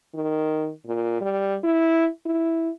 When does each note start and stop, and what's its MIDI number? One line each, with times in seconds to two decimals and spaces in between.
0.15 0.70 51
0.86 1.20 46
1.21 1.57 55
1.64 2.08 64
2.26 2.70 64